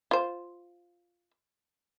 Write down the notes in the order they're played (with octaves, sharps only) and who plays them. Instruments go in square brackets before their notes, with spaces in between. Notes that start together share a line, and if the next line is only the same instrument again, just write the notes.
[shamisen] F4 C5